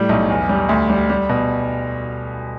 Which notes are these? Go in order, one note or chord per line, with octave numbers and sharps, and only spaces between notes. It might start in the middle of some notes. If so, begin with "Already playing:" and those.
Already playing: A2 G3
B1
E2
G3
D2
G3
G3
B2